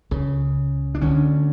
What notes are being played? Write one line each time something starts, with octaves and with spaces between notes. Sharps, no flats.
C#2 C#3
D4
D2 D3 C#4